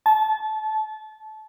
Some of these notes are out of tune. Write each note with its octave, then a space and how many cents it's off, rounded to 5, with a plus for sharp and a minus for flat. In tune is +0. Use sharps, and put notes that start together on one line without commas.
A5 -25